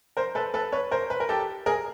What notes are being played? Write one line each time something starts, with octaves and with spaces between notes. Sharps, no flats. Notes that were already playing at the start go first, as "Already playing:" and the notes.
A#4 C5
A4 B4
A4 B4
B4 C#5
A#4 C5
B4
A#4
G4 A4
G#4 A#4